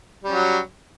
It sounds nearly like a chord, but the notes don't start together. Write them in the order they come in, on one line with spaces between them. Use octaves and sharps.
G3 C#4 F#3